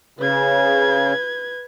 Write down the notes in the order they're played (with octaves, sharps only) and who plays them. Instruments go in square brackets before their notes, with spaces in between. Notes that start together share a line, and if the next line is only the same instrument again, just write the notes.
[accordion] C#3 [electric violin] B4 G#6